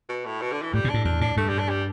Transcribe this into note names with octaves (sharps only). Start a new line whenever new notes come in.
B2
A2
B2
D3
E3
A2 G3
B2
A2 D4
E2 D4
A2 D4
G2 A3
G3
D4
G3